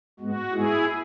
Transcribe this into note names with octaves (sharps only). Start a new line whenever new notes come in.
G#2 G#3 B3 F#4
G#2 G#3 B3 E4 G#4